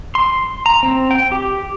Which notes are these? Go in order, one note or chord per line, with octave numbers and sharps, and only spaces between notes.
C6
A#5
C4
G5
G4